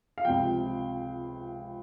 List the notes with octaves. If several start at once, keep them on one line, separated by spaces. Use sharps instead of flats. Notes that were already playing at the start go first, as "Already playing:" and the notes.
F5
C#2 C3 F3 G5